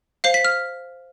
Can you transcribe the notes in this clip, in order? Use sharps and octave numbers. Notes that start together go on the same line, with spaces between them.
C5 F5 C7
B6
F6